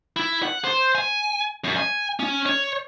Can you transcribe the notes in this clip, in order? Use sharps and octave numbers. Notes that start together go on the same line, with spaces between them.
E4
F#5
C5
G#5
F#2
G#5
C#4
C#5